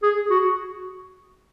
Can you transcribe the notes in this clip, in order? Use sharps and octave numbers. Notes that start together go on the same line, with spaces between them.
G#4
F#4